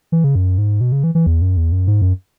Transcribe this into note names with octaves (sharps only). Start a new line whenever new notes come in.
E3
C#3
F#2
G#2
B2
C#3
E3
E3
E2
F#2
E2
F#2
G#2
F#2